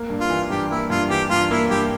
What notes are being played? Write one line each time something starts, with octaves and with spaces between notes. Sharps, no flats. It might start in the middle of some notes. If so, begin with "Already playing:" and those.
Already playing: A#3
G2
F4
E3
G2 G4
A#3 E4
G2 F4
E3 G4
G2 F4
A#3 E4
G2 G4